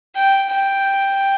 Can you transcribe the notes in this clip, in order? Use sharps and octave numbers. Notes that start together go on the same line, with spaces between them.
G5
G5